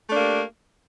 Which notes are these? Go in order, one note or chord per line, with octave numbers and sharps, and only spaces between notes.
A3 A#3 D4 G4